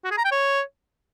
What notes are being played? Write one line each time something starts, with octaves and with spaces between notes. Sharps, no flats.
F#4
G#4
A#5
G5
C#5